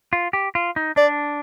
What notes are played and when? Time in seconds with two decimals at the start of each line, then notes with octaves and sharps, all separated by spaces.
0.13 F4
0.33 G4
0.55 F4
0.76 D#4
0.96 D4 D5